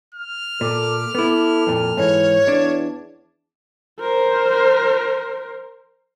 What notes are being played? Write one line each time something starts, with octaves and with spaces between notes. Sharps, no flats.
F6
A#2 A4 D6
B3 E4 A4
F2 A#2
G#2 E3 C#5
E2 D4
A#4 C5